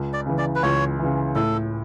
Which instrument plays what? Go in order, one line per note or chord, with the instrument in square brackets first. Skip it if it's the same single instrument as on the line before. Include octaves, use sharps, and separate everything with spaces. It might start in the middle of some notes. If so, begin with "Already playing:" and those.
Already playing: [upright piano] C#2
[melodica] D5
[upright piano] C#3 E3
[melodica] D5
B4
[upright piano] C#2 [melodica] C#5
[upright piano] C#3 E3
[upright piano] A2 [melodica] A4